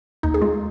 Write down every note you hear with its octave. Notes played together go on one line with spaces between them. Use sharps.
D#2 D#4
G#4
G#3 F4